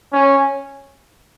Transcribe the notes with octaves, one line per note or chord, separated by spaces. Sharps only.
C#4